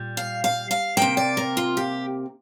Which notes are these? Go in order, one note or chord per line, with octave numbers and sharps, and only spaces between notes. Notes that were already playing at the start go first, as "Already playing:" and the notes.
Already playing: A#2 G3
F5
F5
F5
C3 A#3 G5
D5
A#4
F4
G4